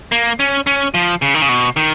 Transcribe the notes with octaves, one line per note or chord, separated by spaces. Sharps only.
A#3
C#4
C#4
F3
C#3
D#3
C#3
B2
D#3